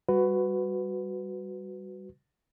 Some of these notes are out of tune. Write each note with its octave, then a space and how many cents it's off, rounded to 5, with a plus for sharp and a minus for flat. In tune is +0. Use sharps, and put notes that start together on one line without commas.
G3 +0 F#4 +0 B4 +15